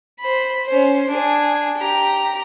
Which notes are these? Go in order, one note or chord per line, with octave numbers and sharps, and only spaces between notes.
C5 B5
C#4 C5
D4 G#4
G4 A#5